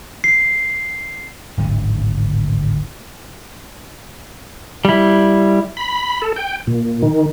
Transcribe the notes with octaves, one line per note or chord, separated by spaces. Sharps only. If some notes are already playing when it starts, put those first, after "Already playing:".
C7
D1 G#1 D3
G3 E4
B5
A4
G5
A#2
D#3